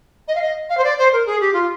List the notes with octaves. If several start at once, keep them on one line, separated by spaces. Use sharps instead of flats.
D#5
F5
D#5
F5
C5
D5
C5
A#4
G#4
G4
F4